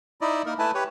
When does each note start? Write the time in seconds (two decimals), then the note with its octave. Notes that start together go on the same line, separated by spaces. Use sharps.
0.21 D#4 E4 D5 D#5
0.46 A#3 D#4 A#4
0.59 A3 E4 B4 G#5 A5
0.74 G4 B4 C#5